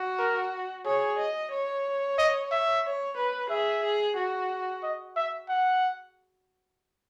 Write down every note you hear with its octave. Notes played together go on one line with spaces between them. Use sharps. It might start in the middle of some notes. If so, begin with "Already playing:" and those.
Already playing: F#4
A#4
G#4 C#5
D#5
C#5
D#5
E5
C#5
B4
G#4 E5
G#4
F#4
D#5
E5
F#5